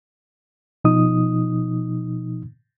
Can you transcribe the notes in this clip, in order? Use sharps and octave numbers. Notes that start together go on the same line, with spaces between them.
B2 F3 D#4 D#6